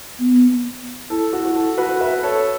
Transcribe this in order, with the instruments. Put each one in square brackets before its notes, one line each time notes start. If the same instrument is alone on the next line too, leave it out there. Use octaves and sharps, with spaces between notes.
[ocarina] B3
[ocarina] E4 [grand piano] A4
[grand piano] F#4
F#4
A4
F#4 B4
B4 E5
A4 C#5